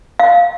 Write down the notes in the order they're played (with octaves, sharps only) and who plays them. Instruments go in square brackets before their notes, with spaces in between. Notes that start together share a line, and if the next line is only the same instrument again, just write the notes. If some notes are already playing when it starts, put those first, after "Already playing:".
[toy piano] F5